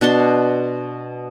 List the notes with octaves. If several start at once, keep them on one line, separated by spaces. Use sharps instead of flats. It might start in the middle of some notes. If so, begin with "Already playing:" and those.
B2 D4 A5 C6